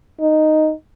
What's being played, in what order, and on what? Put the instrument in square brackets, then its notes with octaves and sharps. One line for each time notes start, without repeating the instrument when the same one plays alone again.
[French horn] D#4